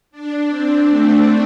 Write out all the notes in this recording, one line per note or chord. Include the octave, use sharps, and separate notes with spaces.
D4
C4
A3